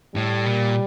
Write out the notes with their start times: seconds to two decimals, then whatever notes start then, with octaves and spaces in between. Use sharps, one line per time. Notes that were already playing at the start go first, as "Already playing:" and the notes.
0.15 A2 G3
0.46 A#2